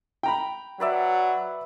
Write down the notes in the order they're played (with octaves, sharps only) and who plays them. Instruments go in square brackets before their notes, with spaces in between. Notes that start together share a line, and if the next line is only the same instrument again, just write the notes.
[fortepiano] G5 A#5 B5
[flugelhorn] F#3 [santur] B4 D5 E5